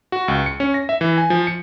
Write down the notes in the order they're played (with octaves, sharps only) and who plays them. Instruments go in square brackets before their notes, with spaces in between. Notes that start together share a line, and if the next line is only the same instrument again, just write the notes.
[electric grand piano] F#4
C#2
C#7
C#4
A#6
E5
E3
G#5
F3
C#7